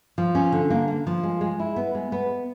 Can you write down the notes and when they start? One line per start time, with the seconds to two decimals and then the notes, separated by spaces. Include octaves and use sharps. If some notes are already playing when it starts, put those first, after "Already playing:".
0.18 F3
0.35 C#4
0.52 D3
0.70 A#3
0.88 A#3
1.07 F3
1.23 G#3
1.41 G#3
1.59 E4
1.76 B3
1.95 G#3
2.12 B3